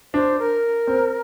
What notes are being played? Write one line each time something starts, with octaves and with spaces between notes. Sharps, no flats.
D4 C5
A#4
C4